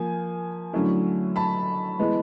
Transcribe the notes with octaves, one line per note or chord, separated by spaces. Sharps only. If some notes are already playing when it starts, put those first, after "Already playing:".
Already playing: F3 A#3 G#5
D3 F#3 A3 C#4 E4
A5 B5
E3 G#3 B3